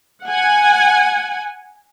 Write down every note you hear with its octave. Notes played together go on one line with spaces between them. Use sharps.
F#5 G#5